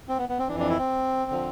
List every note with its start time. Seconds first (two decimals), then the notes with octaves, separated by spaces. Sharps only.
0.09 C4
0.18 B3
0.29 B3
0.39 C4
0.48 E3 D4
0.53 F2
0.60 D4
0.69 E4
0.79 C4
1.31 D3 F3